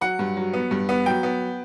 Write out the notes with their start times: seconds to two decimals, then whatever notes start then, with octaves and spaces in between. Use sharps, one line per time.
0.01 F#3 F#5
0.19 G2
0.36 F#3
0.53 B3
0.71 G2
0.89 B3
1.06 F#3 G5
1.23 B3